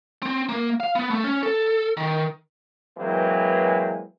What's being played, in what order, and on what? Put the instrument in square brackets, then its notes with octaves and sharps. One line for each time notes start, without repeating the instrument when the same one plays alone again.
[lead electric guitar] C4
A#3
F5
B3
A3
C#4
A4
D#3
[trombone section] E3 F#3 G#3 A#3 C4 B4